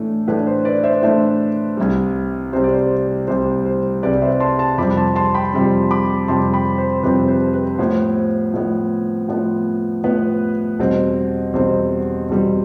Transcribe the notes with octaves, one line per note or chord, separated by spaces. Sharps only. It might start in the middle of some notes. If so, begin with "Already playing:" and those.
Already playing: A2 E3 A3 D4
A2 E3 A3 D4 B4
C5
B4 D5
C5 E5
A2 E3 A3 D4 C5 E5
C2 C3 G3
C2 C3 G3 C5
D5
C5
C2 C3 G3 C5
C5
C2 C3 G3 B4 D5
C5 E5
A5 C6
A5 C6
F2 C3 G3 C4 B5 D6
A5 C6
A5 C6
G5 B5
F2 C3 G3 C4
B5 D6
F2 C3 G3 C4 A5 C6
G5 B5
C5
F2 C3 G3 C4 B4
C5
B4
A2 F3 B3 C5
C5
A2 F3 B3
A2 F3 B3
A2 F3 B3 B4
E2 B2 G3 C4
E2 B2 G3 C4 C5
E2 B2 G3 C4